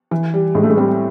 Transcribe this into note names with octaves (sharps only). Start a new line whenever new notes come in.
E3
G3
A2 G#3
A3
G#3
G3 C4